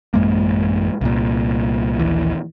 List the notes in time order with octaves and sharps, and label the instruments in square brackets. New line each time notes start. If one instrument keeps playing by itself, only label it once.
[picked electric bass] A1 F#2 G#3 A#3
C2 A#2
A#1 D#2 E3